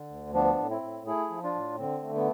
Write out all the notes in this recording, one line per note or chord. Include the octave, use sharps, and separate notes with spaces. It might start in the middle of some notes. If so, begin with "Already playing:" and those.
Already playing: D3
D2
F3 B3 D4
A2
C4 E4
A2
A3 E4 G#4
F3
D4 F4
A2
D3 C4
A3
B3